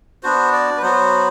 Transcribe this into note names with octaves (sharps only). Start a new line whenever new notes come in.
B3 D4 F#4 C5
D5
B4
F#3 B3 F#4 C5